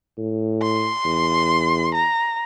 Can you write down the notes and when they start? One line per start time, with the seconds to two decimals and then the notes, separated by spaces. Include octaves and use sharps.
0.18 A2
0.62 C6
1.05 E2
1.95 A#5